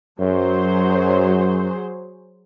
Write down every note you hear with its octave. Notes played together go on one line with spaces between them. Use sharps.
F#2 F#3 G#4 C5